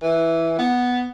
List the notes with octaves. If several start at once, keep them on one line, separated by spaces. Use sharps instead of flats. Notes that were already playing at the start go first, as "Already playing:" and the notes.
E3
B3